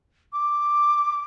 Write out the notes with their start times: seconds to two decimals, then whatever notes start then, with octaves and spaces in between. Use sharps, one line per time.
0.33 D6